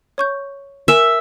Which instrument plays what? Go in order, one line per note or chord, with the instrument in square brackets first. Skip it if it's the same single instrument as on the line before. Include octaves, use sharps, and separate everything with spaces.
[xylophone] C#5 C#6 G6
[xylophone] A#4 G#5 [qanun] E5